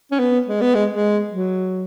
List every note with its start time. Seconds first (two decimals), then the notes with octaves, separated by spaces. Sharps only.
0.11 C#4
0.19 B3
0.47 G#3
0.61 B3
0.74 G#3
0.89 G#3
1.30 F#3